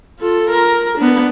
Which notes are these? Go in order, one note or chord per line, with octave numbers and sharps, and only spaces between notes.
F4 A4
A#4
B3 D4